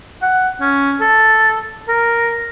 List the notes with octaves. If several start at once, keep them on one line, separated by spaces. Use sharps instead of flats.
F#5
C#4
A4
A#4